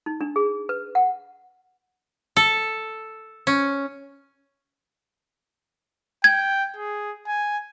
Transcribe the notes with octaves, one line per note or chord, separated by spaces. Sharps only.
D#4
D4
G#4
B4
F#5
A4
C#4
G5 G#6
G#4
G#5